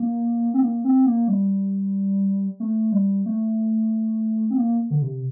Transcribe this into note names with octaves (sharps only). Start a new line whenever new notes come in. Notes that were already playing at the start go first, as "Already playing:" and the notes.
Already playing: A#3
C4
A#3
C4
A#3
G3
A3
G3
A3
C4
A#3
D3
C3